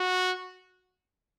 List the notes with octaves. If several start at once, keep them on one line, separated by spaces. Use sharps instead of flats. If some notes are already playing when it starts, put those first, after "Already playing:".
Already playing: F#4